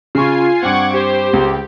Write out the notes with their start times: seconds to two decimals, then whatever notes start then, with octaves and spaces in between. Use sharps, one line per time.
0.15 C#3 F4 G#5 C#6 C7
0.63 G2 C4 F#5 C#6 D6 G#6
0.93 G4 C5
1.33 C#2